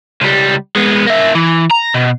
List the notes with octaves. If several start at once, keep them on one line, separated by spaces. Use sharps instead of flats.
C#2 G3
G#3 B3
A#3 E5
E3
A#5
B2